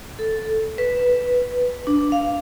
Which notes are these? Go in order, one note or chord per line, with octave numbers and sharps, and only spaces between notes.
A4
B4
D4
F5